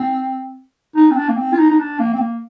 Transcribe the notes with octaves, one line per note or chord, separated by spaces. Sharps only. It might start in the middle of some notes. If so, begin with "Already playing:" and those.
Already playing: C4
D#4
C4
D4
A#3
C4
F4
D#4
D#4
D4
A#3
C4
A#3